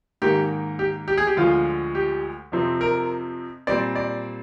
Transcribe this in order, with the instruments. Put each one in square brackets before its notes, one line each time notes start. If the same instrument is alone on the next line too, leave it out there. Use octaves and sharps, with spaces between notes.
[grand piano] G#2 D#3 A#3 G4
G4
G4
G#4
G4
D2 D3 F3 G#3 F4
G4
F2 C3 F3 C4
A#4
A#2 G3 C4 D5
D5